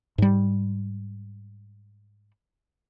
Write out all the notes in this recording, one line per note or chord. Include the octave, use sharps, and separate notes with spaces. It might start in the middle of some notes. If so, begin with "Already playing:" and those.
G#2 G3